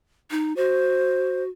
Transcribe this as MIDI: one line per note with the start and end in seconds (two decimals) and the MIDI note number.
0.31 0.56 63
0.57 1.49 66
0.57 1.43 72